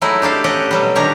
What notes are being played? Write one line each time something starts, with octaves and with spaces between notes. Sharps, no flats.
F#3 G#3 A3 D#4 E4
D4 G4 A4 F5
C#4 G4 D#5 F#5
B2 F#3 G3
A#2 D#3 D4 G4 C#5 A#5